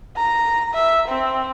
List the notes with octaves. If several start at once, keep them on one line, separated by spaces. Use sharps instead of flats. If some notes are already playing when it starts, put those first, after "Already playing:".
A#5
E5
C4